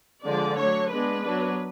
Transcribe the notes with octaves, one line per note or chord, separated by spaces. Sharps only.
D3 F3 G#3 D4 D5
F#3 A3 D4 C#5
G#3 B3 D4 B4
F#3 B3 D4